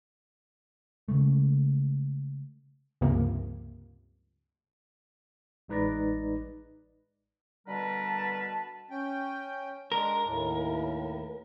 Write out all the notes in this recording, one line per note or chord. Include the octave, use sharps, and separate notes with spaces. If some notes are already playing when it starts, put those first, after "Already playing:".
C#3 G#3 A3
C#2 G2 C3 F3 A#3
A1 G#3 D#4 B4 D5 A#6
B2 D3 G3 A#4 B4 A5
C#4 G5
G#3 D4 A#4
D#2 A2